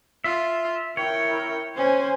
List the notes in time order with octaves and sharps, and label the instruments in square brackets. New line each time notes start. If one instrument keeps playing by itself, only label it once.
[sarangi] F4 [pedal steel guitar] E5
[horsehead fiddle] E4 A#4 [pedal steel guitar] C#5 [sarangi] G5
[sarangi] C#4 [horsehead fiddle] C5 G#5